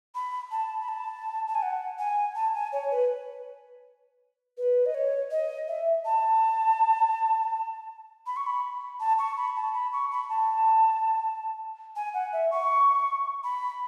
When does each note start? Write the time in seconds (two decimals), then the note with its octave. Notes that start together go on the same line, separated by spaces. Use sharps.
0.15 B5
0.51 A5
0.81 B5
0.88 A5
1.47 A5
1.55 G#5
1.62 F#5
1.99 G#5
2.35 A5
2.55 G#5
2.73 C#5
2.91 B4
4.58 B4
4.86 D#5
4.95 C#5
5.31 D#5
5.68 E5
6.05 A5
8.27 B5
8.37 C#6
8.46 B5
9.00 A5
9.19 C#6
9.37 B5
9.56 A5
9.74 B5
9.93 C#6
10.12 B5
10.29 A5
11.96 G#5
12.14 F#5
12.33 E5
12.51 C#6
13.44 B5